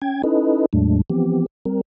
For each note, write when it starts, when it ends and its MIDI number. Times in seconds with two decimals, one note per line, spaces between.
0.02 0.22 61
0.02 0.22 79
0.02 0.22 92
0.24 0.66 61
0.24 0.66 63
0.24 0.66 64
0.24 0.66 69
0.24 0.66 71
0.24 0.66 75
0.73 1.02 40
0.73 1.02 45
0.73 1.02 54
0.73 1.02 56
0.73 1.02 57
0.73 1.02 62
1.10 1.46 52
1.10 1.46 53
1.10 1.46 59
1.10 1.46 60
1.10 1.46 67
1.65 1.81 55
1.65 1.81 60
1.65 1.81 70